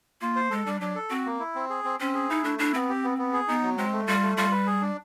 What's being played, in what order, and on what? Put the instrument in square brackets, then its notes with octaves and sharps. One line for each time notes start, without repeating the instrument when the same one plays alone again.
[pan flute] A#3 [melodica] F4
[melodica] C5
[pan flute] G#3 [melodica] A4
[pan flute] G3 [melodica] D4
[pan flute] F#3 [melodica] D4
[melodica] A4
[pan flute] C4 [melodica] F#4
[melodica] A#3
E4
C4
G#4
C4
[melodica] C4 [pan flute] C#4
[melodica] G#4
[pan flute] D#4 [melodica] E4
[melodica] A3 [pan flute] D4
[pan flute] D4 [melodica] E4
[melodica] B3 [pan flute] C4
[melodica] G4
B3
B3
G#4
[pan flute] B3 [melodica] D#4
[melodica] F#3
[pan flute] G#3 [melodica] C4
[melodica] A3
[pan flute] G3 [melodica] F4
[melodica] A3
[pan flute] G3 [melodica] F4
[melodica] B4
G#4
D4